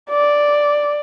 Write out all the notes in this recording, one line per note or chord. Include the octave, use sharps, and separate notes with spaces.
D5